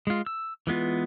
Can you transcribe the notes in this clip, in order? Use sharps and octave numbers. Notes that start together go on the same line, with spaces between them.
G#3 F4
E6
E3 G#3 B3 F4